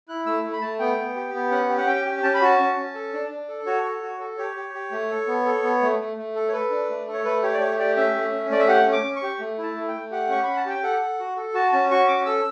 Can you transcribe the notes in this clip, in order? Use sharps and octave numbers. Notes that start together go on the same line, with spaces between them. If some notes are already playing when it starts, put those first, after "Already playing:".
E4 F#6
A3 E6
A3
B5
A3 A5
B3 G5
B3
G4
B3
C#4 F#5
G4
F#5
C#4 G5
G4
C#4 A5
B5
F#4 A5
C#4
C#4
A4
D4
D4
A4
F#4 C#5
A4
F#4
A4
G4 C#5
G4
G4
A3
A4
B3
A4
B3
A3
A3
A3
A4
C#5
A4 B4
D4
A3
A4
C#5
A3 B4
G4 C#5
D5
A3 C#5
G4 D5
C#4 E5
A3
C#4
A3 D5
E5
G4 F#5
C#4
D6
C#4
C#6
G4
A3
E4 A5
A3
G5
A3
G4 F#5
C#4 C#6
C#4 B5
A5
G4 G5
A4 F#5
A4
F#4
A4
F#4 A5
C#4 A5
F#4 C#6
C#4 D6
A4 E6